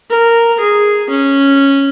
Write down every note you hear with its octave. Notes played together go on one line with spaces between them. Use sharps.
A#4
G#4
C#4